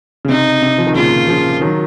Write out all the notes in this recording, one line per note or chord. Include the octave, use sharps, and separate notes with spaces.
C#3
C3 D#4
C3
F3
D#3
A#2 C#3 F4
C#3 F3
D#3 F#3